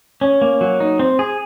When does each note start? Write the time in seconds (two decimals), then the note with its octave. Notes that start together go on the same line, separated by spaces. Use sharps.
0.21 C#4
0.42 A#3
0.61 F#3
0.80 D#4
0.99 C4
1.19 G#4